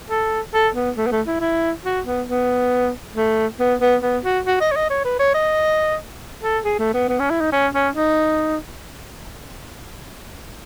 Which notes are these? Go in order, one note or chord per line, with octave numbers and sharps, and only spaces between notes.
A4
A4
B3
A3
B3
A3
E4
E4
F#4
B3
B3
A3
B3
B3
B3
F#4
F#4
D#5
C#5
D#5
C#5
B4
C#5
D#5
A4
G#4
A3
B3
B3
C#4
E4
D#4
C#4
C#4
D#4